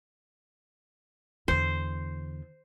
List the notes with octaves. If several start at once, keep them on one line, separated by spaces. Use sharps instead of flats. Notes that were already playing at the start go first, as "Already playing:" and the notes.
E2 D3 C5